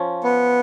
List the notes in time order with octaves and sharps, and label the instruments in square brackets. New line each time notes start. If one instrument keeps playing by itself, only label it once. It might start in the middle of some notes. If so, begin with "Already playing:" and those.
Already playing: [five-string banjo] F3 C#4
[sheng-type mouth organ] B3